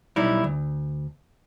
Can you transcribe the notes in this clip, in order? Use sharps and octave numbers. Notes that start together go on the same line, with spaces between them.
B1 G3 D#4 E4
D2